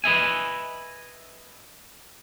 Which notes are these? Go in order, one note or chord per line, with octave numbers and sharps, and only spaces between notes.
B4 D#5 E5 G#5